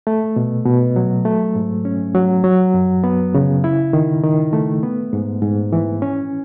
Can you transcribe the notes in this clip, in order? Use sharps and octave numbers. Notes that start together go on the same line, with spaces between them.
A3
B2
B2
F#3
A3
G#2
C#4
F#3
F#3
F#2
B3
C#3
E4
D#3
D#3
A3
B3
G#2
G#2
E3
C#4